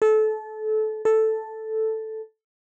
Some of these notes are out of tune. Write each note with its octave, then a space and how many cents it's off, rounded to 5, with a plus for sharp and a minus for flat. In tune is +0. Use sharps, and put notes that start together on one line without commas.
A4 -25
A4 +0